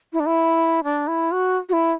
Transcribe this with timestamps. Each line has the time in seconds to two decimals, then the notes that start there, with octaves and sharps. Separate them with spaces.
0.13 E4
0.20 D4
0.26 E4
0.84 D4
1.08 E4
1.32 F#4
1.69 F#4
1.73 E4